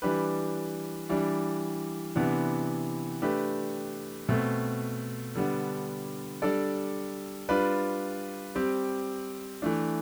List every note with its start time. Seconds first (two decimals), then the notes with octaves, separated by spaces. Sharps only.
0.02 E3 G3 D4 G4 B4
1.09 E3 G3 D4
2.16 C3 E3 B3 D4
3.22 A3 D4 G4 B4
4.29 B2 A3 C4
5.35 D3 G3 B3 D4
6.42 G3 D4 A4 D5
7.49 G3 D4 F4 B4 D5
8.55 G3 C4 G4
9.62 E3 A3 D4